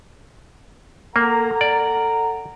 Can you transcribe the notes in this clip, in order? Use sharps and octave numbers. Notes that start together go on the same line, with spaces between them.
A#3 A4 F#5 A#5
D5